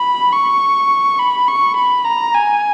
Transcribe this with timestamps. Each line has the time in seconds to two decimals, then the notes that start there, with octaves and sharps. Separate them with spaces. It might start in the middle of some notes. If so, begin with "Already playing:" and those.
Already playing: B5
0.33 C#6
1.19 B5
1.48 C#6
1.76 B5
2.05 A#5
2.34 G#5